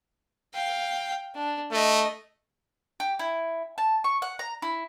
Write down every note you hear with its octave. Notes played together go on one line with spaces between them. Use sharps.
F5 G5
D4
A3 D#5
G4
E4
A5
C#6
F#5
A#5
E4